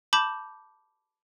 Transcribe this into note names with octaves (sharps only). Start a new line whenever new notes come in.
A5 B5 D6 G6